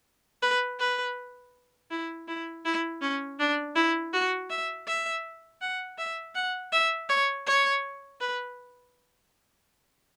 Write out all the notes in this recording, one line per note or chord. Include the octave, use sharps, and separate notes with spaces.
B4
B4
E4
E4
E4
C#4
D4
E4
F#4
E5
E5
F#5
E5
F#5
E5
C#5
C#5
B4